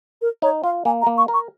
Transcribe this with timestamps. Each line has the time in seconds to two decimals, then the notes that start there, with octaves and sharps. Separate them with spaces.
0.22 A#4
0.42 D#4 C#5
0.64 F4 F5
0.85 A#3 G#5
1.02 A#5
1.07 A#3
1.18 C#6
1.28 A#4
1.34 C#6